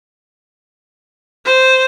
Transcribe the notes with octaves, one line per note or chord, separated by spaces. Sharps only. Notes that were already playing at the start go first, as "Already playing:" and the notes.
C5